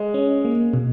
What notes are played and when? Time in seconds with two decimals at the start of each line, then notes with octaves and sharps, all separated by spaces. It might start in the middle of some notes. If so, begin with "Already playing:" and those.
Already playing: G#3
0.14 C#4
0.45 A#3
0.74 B2